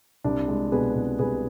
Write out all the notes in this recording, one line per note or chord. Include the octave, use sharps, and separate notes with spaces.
C2 D4
G#3
B2 G#4 B4
C2
C2 G#4 B4